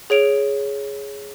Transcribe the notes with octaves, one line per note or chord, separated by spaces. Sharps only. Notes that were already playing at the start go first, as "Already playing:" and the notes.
G#4 C#5 D7 F7